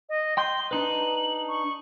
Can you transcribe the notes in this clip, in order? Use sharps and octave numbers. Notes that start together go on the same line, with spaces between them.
D#5
G5 C6 G6 G7
D4 D#4 B4 F#7
C#6